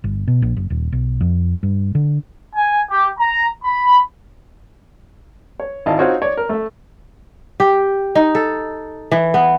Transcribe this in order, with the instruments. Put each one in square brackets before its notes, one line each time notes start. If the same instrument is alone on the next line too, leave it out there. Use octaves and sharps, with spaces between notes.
[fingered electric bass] G1
B2
A#1
F#1
D#1
B1
F2
G2
D3
[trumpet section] G#5
G4
A#5
B5
[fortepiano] C#5
G#1 E4 D5 D#5 F5 A5
C4 D#4 F4 F#4 C#5
C#5 D5
A#4
A3 E5
[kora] G4
D#4
A4
E3
B3